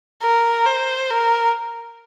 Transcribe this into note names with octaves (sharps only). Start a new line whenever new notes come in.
A#4
C5
A#4